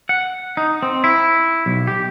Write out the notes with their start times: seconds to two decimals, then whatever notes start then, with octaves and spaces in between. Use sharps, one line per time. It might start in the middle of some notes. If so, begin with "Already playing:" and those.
0.09 F#5
0.57 D#4
0.82 C4
1.04 E4
1.66 B1
1.87 G4